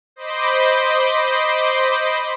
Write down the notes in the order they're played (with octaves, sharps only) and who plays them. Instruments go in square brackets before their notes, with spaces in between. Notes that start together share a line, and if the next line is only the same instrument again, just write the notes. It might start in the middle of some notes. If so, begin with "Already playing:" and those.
[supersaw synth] C5 D#5 B5 C6 D6 G6